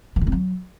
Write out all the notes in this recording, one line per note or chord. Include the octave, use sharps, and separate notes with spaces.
D#3
D3
C4
F#3